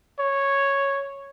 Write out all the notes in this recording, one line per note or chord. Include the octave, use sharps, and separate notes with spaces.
C#5